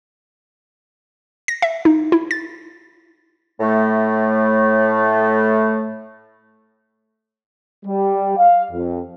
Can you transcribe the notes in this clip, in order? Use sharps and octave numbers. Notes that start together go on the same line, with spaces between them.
A#6
E5
D#4
E4
A6
A2 A3
G3
F5
F2